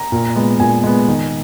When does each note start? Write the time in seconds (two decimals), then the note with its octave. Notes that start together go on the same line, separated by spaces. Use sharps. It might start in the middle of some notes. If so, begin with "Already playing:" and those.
Already playing: A#5
0.12 A#2
0.35 G#3 B3
0.60 A#2 G#5
0.84 G#3 B3
1.08 D#3